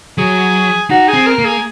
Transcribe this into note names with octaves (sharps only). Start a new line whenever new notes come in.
F#3 G#4
D#4 F#4
G#4
C4
A#4
A#3
G#4